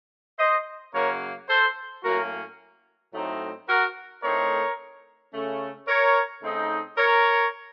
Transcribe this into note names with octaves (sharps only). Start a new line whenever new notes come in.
C5 D#5
F#2 C#3 F#3 A#3 A#4 C#5
A4 C5
A2 F#3 A#3 C#4 F#4 A#4
A2 F#3 A3 C4 D#4
F#4 A#4
A2 A3 C4 D#4 A#4 C#5
C#3 A3 C#4
A#4 C#5
C#3 A3 C4 D#4
A#4 C#5